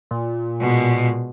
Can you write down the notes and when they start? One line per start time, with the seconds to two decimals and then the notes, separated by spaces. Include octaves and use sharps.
0.11 A#2
0.59 B2 G#3